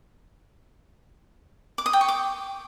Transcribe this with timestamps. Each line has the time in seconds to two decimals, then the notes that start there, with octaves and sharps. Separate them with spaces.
1.78 D6
1.86 D#6
1.93 G5
2.01 C#6
2.08 D6